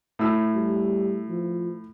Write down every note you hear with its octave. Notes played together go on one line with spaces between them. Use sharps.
A2 E6
G3
F3